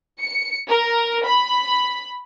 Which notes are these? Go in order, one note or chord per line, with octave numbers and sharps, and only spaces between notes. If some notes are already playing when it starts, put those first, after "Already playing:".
C#7
A#4
B5